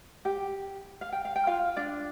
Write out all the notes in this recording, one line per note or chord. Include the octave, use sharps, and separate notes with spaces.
G4 G5
F5
G5
F5
G5
F4 F5
D4 D5